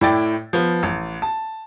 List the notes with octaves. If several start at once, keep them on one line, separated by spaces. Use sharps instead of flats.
A2 E4 D5 G5 A6
F3 B3
A1
A5